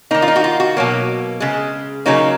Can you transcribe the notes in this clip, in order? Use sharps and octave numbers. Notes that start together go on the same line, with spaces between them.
D#3 A#3 D#4
F4
D#4
F#4
F4
F#4
B2 F#3 A#3
C#3 G#3
C#3 F#3 A#3 D#4